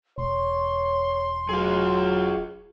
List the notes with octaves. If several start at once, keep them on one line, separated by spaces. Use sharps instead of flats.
E1 C#5 C6
F#3 F4 G#4